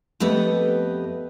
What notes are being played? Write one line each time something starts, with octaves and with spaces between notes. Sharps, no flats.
F2 A3 B3 G4 B4 D#5